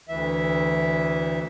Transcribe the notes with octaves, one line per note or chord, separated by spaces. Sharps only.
D2 E3 E5